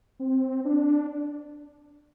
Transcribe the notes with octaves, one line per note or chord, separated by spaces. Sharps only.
C4
D4